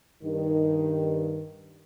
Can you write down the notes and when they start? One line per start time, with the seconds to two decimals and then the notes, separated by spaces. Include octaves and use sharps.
0.24 G2 D#3